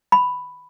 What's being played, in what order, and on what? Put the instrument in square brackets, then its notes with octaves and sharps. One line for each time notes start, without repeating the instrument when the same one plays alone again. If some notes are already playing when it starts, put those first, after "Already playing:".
[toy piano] B5